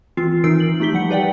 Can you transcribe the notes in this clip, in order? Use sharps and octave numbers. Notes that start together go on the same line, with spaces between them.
E3 C4 F4 C7
E3 D#4 A#4 E6 C7 D7
F#7
A3 D#4 G4 B6 G7
F3 G3 F#5 C#7
G4 B4 D5 F#5 G5